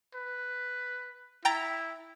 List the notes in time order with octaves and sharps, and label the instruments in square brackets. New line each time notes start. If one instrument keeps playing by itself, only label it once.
[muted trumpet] B4
[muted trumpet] E4 [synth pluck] G5 A#5 A6